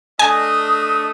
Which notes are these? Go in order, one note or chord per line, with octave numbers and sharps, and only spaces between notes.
A3 D4 D#5 G#5 D#6